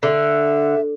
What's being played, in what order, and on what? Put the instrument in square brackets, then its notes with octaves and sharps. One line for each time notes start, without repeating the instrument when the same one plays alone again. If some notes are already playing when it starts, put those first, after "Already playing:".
[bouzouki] D3 [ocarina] E5